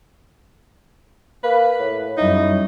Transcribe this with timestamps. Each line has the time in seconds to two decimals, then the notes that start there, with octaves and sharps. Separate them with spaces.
1.44 A#3 B4
1.79 A2
2.18 F#2 G3 D#4 E4